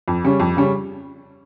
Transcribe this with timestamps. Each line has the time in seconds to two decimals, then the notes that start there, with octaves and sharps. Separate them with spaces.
0.08 F2
0.24 C#3 G3 C#4
0.40 F2
0.57 C#3 G3 C#4